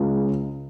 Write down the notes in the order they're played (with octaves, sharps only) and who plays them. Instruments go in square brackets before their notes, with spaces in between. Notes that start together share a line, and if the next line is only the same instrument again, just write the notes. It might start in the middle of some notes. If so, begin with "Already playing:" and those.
Already playing: [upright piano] C#2 C#3 G#3